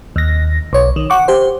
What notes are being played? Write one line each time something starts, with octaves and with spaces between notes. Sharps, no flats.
D#2 A#6
B1 C#5
D#3
F#5 C#6 D6
G4 C5